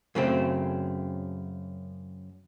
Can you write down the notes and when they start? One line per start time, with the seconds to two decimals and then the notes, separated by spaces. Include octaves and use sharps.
0.15 F#2 C#3 A3 C4